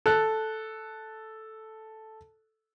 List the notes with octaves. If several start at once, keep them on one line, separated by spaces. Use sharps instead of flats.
A4 F#6